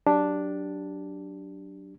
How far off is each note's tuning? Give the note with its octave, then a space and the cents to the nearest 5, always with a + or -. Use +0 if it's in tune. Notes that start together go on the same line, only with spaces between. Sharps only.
F#3 +10 D4 +0 G4 +0